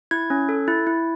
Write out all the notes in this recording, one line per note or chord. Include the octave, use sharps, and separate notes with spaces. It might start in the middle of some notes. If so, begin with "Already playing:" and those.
E4 G#6
C#4
A4
E4
E4